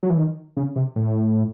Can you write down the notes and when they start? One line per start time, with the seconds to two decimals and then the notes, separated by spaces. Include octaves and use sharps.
0.03 F#3
0.10 E3
0.17 D#3
0.57 C#3
0.76 C3
0.96 A2